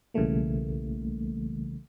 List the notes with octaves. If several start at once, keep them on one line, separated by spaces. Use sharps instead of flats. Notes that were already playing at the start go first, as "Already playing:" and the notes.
B1 C#3 E3 G3 A3 A#3